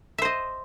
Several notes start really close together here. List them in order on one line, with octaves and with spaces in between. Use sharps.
E5 C5 D#5